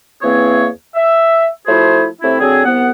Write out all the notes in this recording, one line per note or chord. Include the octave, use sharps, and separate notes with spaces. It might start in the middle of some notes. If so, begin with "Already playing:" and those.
E2 E3 A#3 C4 G#4 C#5
E5
F3 A3 E4 F#4 G#4 C5
C3 A3 C4 E4
D3 F#3 C4 G#4
C2 B3 F#5